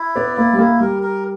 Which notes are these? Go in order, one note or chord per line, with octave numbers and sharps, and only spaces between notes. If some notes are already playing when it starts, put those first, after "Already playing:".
Already playing: E4
B3 D5
A#3 E4
G3
A#3 E4
G3 A#4
A#4